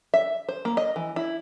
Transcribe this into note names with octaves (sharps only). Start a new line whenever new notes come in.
E5
C5
A#3
D#5
E3
E4